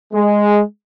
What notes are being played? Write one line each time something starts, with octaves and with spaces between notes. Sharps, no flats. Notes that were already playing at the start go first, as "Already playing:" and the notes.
G#3